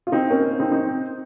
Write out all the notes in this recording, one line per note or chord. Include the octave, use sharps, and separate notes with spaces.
F4
C4 D#4
A#3 C#4
C4 D#4
C4 D#4